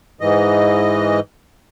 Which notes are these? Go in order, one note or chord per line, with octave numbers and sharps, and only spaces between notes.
G#2 E3 D#5